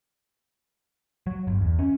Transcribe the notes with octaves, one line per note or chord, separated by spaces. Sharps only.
F#3
G1
E2
C#4